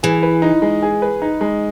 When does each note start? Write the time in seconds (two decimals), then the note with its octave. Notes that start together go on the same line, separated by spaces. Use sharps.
0.03 E3 G#4
0.23 B4
0.42 D#4
0.62 G#3
0.82 G#4
1.02 B4
1.22 D#4
1.41 G#3